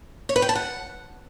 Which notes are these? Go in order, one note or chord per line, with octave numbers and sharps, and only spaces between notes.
C#5
B4
G5
A5
F#5